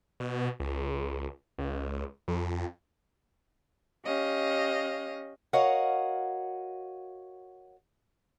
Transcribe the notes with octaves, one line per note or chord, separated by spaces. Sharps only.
B2
C#2
C#2
F2
C#4 G4 D#5 F5
F#4 A#4 C#5 D#5 F5 F#5